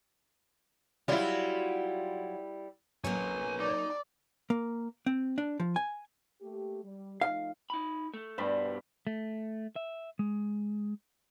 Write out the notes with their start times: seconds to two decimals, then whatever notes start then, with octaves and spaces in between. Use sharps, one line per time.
1.08 F#3 G3 E4 F4
3.04 F#3 A#3 C#4 B4 C#5 G#5
3.60 D#4 D5
4.50 A#3
5.06 C4
5.38 D4
5.60 F3
5.76 G#5
6.41 A3 A#3 G4
6.83 G3
7.21 F3 A3 D#4 F5
7.70 D#4 B5
8.14 A3
8.38 G2 B2 G3 C5 B5
9.07 A3
9.76 E5
10.19 G#3